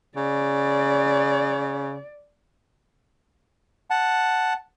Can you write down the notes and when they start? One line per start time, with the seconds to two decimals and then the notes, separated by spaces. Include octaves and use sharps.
0.16 C#3 D5
3.90 F#5 A5